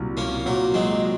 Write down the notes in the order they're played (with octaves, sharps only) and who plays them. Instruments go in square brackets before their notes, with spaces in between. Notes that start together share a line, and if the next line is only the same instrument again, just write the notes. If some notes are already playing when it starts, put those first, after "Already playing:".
Already playing: [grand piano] C2 A#2 F#3
[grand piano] C2 [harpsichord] A#3 C#4
[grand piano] A#2 [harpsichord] F#3 A#3
[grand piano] F#3 [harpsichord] G#3 C4